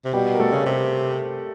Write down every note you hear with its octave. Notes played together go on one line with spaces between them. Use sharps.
C3
B2 G3 G4
A#4
A3 A4
C#3
C3